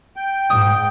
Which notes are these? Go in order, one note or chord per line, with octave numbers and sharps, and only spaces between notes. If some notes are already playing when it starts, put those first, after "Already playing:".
G5
G#2 D#6